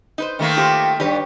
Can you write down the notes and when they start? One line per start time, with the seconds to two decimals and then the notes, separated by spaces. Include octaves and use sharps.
0.18 D#4 B4 C5
0.39 D#3 A3 A#3
0.57 F4 G4 C5
1.00 E2 G2 G4 B4 C#5